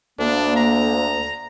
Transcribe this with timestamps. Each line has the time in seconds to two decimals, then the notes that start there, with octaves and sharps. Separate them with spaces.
0.19 D2 A#3 D4
0.56 A#5